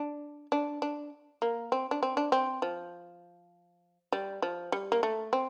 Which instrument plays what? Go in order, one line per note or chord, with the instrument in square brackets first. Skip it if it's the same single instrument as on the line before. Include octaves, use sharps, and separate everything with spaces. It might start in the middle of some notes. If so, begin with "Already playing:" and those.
Already playing: [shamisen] D4
D4
D4
A#3
C4
D4
C4
D4
C4
F3
G3
F3
G3
A#3
A3
C4